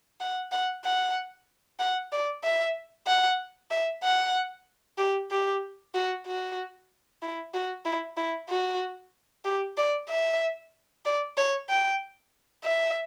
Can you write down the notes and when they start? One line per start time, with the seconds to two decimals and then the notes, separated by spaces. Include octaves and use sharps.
0.20 F#5
0.52 F#5
0.84 F#5
1.79 F#5
2.12 D5
2.44 E5
3.07 F#5
3.71 E5
4.03 F#5
4.98 G4
5.31 G4
5.94 F#4
6.27 F#4
7.22 E4
7.54 F#4
7.85 E4
8.17 E4
8.49 F#4
9.45 G4
9.77 D5
10.09 E5
11.05 D5
11.37 C#5
11.69 G5
12.64 E5